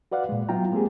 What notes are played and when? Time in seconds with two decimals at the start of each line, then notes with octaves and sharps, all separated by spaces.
0.12 F#4 B4 D5 F5 F#5
0.29 A#2 G#3
0.49 F#3 B3 E4 F4 G5 A#5
0.72 G#3 A#3 C4 G4 G#4